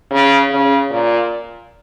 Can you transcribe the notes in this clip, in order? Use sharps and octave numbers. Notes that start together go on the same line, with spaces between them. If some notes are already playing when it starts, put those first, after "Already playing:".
C#3
C#3
A#2